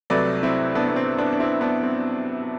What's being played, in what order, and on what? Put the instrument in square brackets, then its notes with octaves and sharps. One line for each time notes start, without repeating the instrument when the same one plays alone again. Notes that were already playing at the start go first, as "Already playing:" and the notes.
[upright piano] C2 C3 F#3 A3 B4 D5
C4 E4
B3 D4
B3
C4
B3 D4
D4
C4 E4
B3 D4
C4